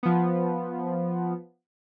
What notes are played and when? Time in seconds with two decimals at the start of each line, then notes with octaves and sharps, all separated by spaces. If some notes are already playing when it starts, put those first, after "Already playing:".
0.03 F3 B3